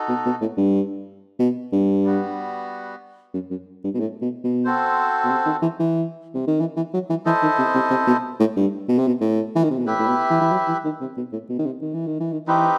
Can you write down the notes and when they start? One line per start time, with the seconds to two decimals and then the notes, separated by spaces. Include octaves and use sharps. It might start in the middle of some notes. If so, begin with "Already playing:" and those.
Already playing: D#4 F#4 A4
0.09 B2
0.26 B2
0.41 A2
0.57 G2
1.39 B2
1.72 G2
2.04 G3 B3 F#4
3.34 F#2
3.50 F#2
3.84 G2
3.94 B2
4.00 A2
4.22 B2
4.44 B2
4.65 C4 F#4 A4 C5
5.24 B2
5.31 C3
5.46 D#3
5.62 E3
5.80 E3
6.34 C3
6.47 D#3
6.60 E3
6.76 E3
6.94 F#3
7.10 E3
7.25 E3 E4 A4 C5 D#5
7.43 D#3
7.58 C3
7.74 C3
7.90 C3
8.07 B2
8.40 A2
8.56 G2
8.88 B2
8.98 C3
9.07 B2
9.21 A2
9.55 E3
9.64 D#3
9.70 C3
9.79 B2
9.86 A2 E4 G4 B4 E5
9.99 A2
10.08 B2
10.30 E3
10.41 E3
10.52 F#3
10.68 E3
10.84 D#3
11.01 C3
11.17 B2
11.32 A2
11.49 B2
11.59 D#3
11.66 C3
11.82 D#3
11.94 E3
12.07 D#3
12.20 E3
12.32 D#3
12.47 E3 C4 D#4 G4 B4